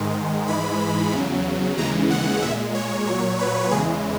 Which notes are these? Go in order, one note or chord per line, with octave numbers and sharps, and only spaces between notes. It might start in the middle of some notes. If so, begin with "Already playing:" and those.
Already playing: G#2 D#3 G#3
G#2 E3 G#3 B5
E2 C#3 F#3
D#2 C#3 E3 G#3 A#5
F#5
A#2 G#3 E5
C#5
A#2 F#3 C#5
B4
E2 C#3 E3 G#3 G#4